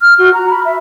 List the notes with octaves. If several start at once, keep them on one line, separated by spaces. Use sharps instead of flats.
F6
F#4
A#5
B5
E5